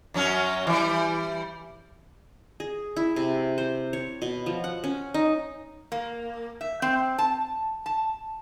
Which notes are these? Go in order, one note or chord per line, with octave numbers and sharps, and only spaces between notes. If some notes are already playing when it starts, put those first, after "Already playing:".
F#2 F#3 C#4
E3 G3
G#4
E4
C3
C5
C#5
B2
F3
F#5
C#4
D#4
A#3
E5
C4
A5
A5